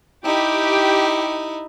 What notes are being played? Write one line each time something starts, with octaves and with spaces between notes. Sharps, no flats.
D#4 E4 G4